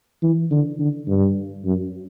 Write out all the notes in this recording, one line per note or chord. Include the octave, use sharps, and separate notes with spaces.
E3
D3
D3
G2
F#2